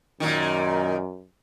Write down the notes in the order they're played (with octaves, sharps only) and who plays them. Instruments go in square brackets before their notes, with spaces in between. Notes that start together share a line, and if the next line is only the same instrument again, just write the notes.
[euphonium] F#2 [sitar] A#2 D#3